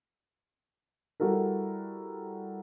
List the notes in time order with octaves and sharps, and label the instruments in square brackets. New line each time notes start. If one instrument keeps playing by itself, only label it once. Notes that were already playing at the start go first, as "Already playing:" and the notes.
[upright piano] G3 E4 F#4 A4 A#4